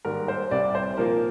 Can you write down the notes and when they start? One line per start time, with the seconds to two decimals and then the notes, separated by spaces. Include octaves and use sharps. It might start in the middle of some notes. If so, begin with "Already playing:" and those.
0.05 G#2 D#3 G3 A#3 A#4
0.28 C5
0.51 C2 C3 G3 D5
0.75 C5
0.98 A#2 F3 A#3 A#4